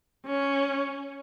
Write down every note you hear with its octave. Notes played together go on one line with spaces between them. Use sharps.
C#4